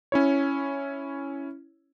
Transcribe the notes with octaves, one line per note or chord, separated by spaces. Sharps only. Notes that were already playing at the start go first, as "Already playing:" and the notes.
C#4 E4 C#5